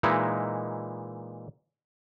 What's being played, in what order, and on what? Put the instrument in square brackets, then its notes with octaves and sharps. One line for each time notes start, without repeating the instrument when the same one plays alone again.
[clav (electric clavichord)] A#2 E3 G#3 D#4 E4